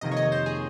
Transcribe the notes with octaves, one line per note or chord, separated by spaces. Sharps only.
F2 C3 D#3 A#3 D#5
C#5
D#5
C5
G#4